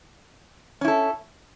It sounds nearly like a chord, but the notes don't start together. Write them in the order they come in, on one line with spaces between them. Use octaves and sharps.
C#4 E4 A4